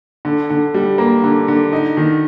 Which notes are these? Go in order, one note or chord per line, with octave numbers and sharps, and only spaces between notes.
D3
D3
G3
A#3
D3
D3
D#4
D#3